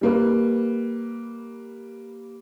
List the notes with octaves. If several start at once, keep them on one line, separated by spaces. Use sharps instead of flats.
G3 A#3 B4